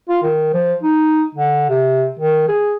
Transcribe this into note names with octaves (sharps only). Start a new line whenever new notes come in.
F4
D#3
F3
D#4
D3
C3
D#3
G#4